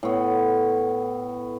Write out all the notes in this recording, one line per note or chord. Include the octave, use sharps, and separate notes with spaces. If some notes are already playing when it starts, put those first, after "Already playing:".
A2 B3